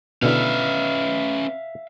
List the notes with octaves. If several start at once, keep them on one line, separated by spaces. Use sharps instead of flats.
B2 D3 C#4 E4 B4 E5 F5